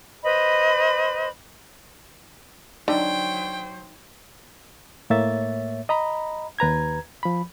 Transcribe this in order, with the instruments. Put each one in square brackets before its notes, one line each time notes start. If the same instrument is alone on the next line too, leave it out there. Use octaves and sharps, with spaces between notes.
[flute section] B4 C5 D#5 B5
[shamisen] D3 [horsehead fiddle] F#3 C5 [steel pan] D#4 [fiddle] G5
[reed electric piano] A2 A#3 C#5 E5 A6
D#5 A#5 B5
D#2 B4 A#5 G#6
F3 B5